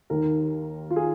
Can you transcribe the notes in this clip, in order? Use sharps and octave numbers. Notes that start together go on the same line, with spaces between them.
D#2 D#3 A#4
F4
G#4